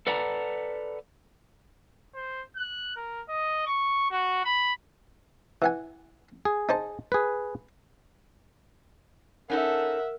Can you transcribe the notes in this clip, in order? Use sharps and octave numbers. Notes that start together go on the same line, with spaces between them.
A4 B4 D5 F#5 A5 A#5
C5
F#6
A#4
D#5
C#6
F#4
B5
E3 F#5 G#5
G#4
D#4 C5 A5
G#4 B4
C#4 D#4 A4 A#4 E5 F#5